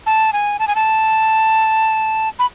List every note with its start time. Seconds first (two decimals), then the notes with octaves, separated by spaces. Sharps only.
0.06 A5
0.33 G#5
0.59 A5
0.68 G#5
0.75 A5
2.39 B5